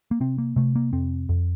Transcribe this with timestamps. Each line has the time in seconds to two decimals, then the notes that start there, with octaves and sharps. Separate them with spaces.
0.11 A#3
0.20 C3 C4
0.38 A#3
0.56 C3 A3
0.76 A#3
0.93 F2 C4
1.29 F2